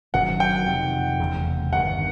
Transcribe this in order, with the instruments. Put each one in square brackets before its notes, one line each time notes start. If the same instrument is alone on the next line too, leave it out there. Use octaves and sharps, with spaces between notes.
[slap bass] F#1 F#2 D#3 F#3 [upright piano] F#5
[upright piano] G5
[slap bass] F2 C3 D#3
F1 E2 C#3
[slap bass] G1 G2 D#3 [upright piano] F#5